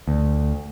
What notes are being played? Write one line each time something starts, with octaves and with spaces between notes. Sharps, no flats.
D2